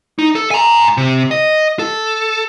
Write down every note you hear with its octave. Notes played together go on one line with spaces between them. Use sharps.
D#4
A4
G#5 A#5
C3
D#5
A4